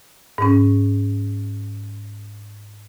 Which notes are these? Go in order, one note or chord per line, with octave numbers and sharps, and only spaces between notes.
G#2 C#4